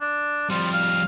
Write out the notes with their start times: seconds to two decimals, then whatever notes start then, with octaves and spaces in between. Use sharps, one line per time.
0.01 D4
0.50 F2 F3 G3
0.73 F5